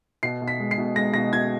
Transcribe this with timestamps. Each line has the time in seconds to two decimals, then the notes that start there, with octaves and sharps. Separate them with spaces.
0.23 B2 C7
0.42 B2
0.48 B6
0.60 G#3
0.71 C7
0.78 B2
0.95 G#3 A#6
1.14 B2 A#6
1.33 B2 G#6